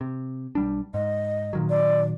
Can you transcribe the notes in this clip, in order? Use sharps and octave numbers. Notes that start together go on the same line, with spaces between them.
C3
B1 G3 D4
G#2 D#5
A#2 D#3 F#3
D5